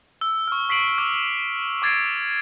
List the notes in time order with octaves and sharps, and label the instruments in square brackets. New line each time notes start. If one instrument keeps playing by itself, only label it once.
[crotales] E6
C#6 F6
C#6 B6 C7 D7 F#7
D6 E6
C#6 D6 G#6 A6 C7 D7